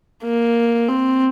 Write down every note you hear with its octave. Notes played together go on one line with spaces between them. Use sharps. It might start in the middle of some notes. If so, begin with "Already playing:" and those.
A#3
C4